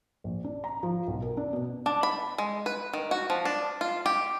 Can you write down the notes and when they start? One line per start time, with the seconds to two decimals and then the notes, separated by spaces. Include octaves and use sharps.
0.24 A#1
0.44 D4
0.64 A#5
0.83 F3
1.08 B1
1.22 A#4
1.37 D4
1.53 B2
1.86 D4
2.03 B5
2.38 G#3
2.66 B4
2.93 D#3
3.11 F#4
3.30 F3
3.45 D4
3.81 F4
4.06 G4